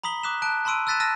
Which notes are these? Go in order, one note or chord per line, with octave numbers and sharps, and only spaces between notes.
A#5 B5 D#6 B6 G7
D6 D#6 F#6 B6 E7
A5 F#6 D7
A5 B5 C6 E6 D7 D#7
E6 F#6 A6 B6 D#7 E7
A5 E6 F6 A6 A#6 D#7